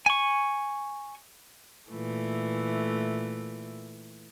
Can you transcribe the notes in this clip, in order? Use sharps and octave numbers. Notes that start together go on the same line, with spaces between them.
G#5 C#6
A#2 E3 A3